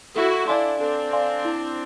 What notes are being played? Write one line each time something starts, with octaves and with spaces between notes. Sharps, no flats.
E4 F#4 A4
D4 E4 D5 F5 G#5 C6
C4 D4 A4
D5 F5 G#5 C6
E4